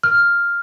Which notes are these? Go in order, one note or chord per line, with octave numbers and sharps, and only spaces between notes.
F6